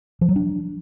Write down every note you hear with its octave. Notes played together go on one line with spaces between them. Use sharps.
F3
F#3
D4